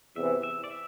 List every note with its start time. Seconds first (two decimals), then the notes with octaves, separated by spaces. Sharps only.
0.16 E2 C3 E3 E5
0.43 E5
0.64 D5
0.71 E5